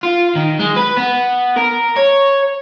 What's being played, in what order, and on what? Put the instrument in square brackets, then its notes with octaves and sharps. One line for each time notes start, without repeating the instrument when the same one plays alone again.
[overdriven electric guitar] F4
D#3
G#3
B4
B3
A#4
C#5